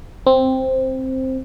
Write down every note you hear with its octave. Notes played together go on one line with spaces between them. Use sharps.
C4